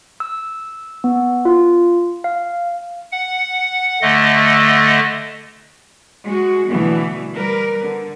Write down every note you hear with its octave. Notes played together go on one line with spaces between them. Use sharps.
E6
B3
F4
F5
F#5
D3 A3 D#5
G#3 F#4
B2 D3 E3 G3 A3 B3
G3 A#4 B4
D3